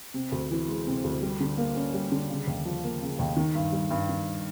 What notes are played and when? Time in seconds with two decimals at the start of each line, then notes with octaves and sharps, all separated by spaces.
0.14 C3
0.32 D2
0.51 E3
0.68 G#3
0.87 C3
1.04 D2
1.22 G3
1.40 D3
1.58 A#3
1.75 C#4
1.94 G3
2.12 D3
2.30 C#3
2.47 D#2
2.65 F3
2.84 A#3
3.02 C#3
3.19 D#2
3.37 D#3
3.55 G2
3.72 G3
3.91 G2
4.09 D#3